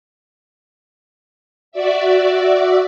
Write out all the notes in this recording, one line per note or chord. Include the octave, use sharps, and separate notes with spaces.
F#4 D5 E5